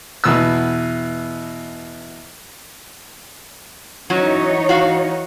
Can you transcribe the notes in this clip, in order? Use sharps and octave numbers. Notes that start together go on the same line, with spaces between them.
E2 B2 E6
E3 F#3 C#4 D#4 C#5
F#4 F5